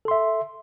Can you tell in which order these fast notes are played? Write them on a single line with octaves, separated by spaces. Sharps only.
A4 C6 E5